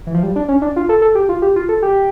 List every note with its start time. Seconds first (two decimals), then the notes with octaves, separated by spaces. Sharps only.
0.07 E3
0.14 F3
0.23 G3
0.36 D4
0.48 C#4
0.62 D4
0.76 F4
0.89 A4
1.02 A4
1.15 G4
1.29 F4
1.42 G4
1.56 F4
1.69 A4
1.82 G4